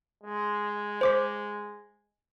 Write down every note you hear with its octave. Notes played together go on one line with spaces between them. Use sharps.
G#3
C5 D6 B6